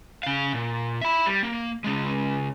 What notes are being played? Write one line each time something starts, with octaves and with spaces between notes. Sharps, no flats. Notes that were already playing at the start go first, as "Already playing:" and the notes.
C#3 F5
A#2
E5 B5
G3
A#3
C#3 G#3